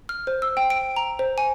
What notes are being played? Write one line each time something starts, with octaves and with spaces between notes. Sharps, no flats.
F6
C5
E6
G5
D7
A#5
C5
G#5